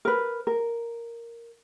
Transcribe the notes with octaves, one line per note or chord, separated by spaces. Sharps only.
A#4 B4
A#4